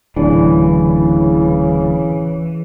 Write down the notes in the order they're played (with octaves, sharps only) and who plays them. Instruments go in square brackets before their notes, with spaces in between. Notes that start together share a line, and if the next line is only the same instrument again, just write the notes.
[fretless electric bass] D1 D4 [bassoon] C#3 [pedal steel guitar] E3